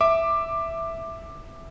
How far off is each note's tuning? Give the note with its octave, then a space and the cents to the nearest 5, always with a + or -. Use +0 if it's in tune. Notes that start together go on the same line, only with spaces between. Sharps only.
E5 +0 D6 +10